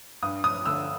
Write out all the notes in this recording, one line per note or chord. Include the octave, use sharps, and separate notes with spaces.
G2 D#6
D#6
D3 E6